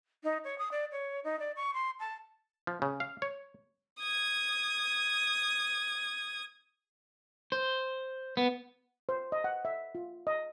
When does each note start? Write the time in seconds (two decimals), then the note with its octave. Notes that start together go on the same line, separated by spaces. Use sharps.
0.24 D#4
0.44 C#5
0.58 D#6
0.72 D5
0.92 C#5
1.24 D#4
1.39 D5
1.56 C#6
1.74 C6
2.00 A5
2.67 F3
2.82 C#3
3.00 F5
3.22 C#5
4.00 D#6 G#6
7.52 C5
8.37 B3
9.09 C5
9.32 D#5
9.44 F#5
9.65 E5
9.95 F4
10.27 D#5